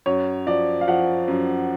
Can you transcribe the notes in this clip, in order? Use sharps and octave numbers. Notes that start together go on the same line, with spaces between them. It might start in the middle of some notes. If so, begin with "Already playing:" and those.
F#2 C#5
F3 D5
F5
F3 F#5
F#2